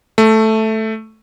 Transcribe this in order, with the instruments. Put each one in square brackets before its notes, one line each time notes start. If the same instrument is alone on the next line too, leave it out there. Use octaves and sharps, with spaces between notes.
[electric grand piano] A3